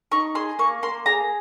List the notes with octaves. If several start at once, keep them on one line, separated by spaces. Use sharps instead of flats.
D#4 C#6
G#4 C6
A#3 C#6
A#3 C6
G#4 A#5